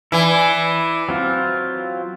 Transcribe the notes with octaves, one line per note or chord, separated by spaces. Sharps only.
E3 E4 D5 G#5
F#3 C4 F4